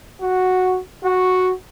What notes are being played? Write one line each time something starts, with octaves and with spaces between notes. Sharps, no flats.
F#4
F#4